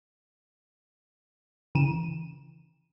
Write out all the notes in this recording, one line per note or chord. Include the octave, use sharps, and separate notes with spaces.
C#3 E3 D#7 E7